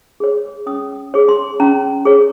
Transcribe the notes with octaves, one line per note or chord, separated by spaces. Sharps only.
G#4 C#5
C#4 D#6
G#4 C#5
C6
C#4 A#5
G#4 C#5